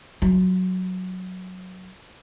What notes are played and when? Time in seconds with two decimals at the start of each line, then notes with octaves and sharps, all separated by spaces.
0.22 F#3 F4